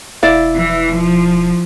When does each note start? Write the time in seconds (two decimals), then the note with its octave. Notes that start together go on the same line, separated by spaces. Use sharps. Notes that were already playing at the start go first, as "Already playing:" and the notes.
0.23 E1 E4 D5 F5
0.56 E3
0.96 F3